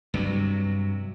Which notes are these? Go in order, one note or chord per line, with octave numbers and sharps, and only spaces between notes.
G2 C3 F#3